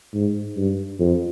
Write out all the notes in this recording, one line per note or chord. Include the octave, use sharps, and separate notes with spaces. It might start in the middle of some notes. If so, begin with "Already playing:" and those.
G#2
G2
F2